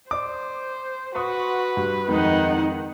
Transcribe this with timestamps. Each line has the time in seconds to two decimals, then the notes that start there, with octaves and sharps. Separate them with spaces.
0.11 C5 D5 D6
1.15 F#4 B4 C6 C#6 D#6
1.77 G2
2.09 F2 D#3 G#3 D#4 F#5 D#6